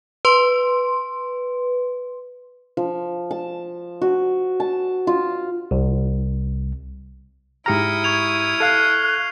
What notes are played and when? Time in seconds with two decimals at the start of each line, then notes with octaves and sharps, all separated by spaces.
0.25 B4 C6
2.77 F3
3.31 A5
4.01 F#4
4.60 A5
5.07 F4
5.71 C2
7.66 G#2 E4 G4 A#5 D#6 F6 C#7
8.04 C#6 G#6 F7
8.60 A4 F5 F6 F#6 C7 C#7